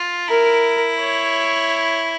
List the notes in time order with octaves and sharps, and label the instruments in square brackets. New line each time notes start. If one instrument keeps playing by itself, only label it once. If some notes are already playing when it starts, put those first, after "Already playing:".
Already playing: [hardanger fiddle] F4
[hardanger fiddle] E4 [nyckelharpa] A#4
[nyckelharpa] C#5